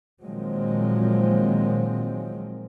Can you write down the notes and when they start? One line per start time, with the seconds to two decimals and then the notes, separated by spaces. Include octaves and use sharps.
0.23 A#2 D#3 F3 F#3 G#3 C4